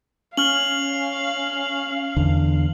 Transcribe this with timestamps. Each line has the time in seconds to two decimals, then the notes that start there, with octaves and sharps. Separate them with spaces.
0.37 C#4 F5 F6 F#7
2.17 E2 D3